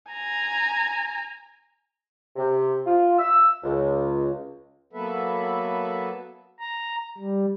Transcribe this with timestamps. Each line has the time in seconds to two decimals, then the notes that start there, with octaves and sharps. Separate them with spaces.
0.11 G#5 A#5
2.36 C3
2.85 F4
3.18 E6
3.64 C#2
4.93 F#3 A#3 B3 A4 B4 E5
6.59 A#5
7.17 G3